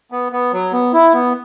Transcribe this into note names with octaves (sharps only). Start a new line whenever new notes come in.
B3
B3
F#3
B3
E4
B3